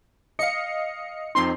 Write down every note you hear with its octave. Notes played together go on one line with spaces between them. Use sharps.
D#5 F5 C#7
F2 C4 D#4 C6